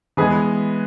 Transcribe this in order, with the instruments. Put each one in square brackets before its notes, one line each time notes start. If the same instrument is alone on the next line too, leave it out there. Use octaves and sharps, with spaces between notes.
[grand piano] E3 G#3 B3 G#4 B4